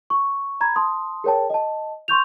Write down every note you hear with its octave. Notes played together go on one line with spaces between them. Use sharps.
C#6
A#5 B5 G#6
A5 C6 D#6
G#4 A#4 C#5 G5 A5
D#5 A5
C6 C#6 G6 F7